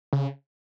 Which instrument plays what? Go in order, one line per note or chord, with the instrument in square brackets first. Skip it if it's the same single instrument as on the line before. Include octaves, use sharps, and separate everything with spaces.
[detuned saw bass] C#3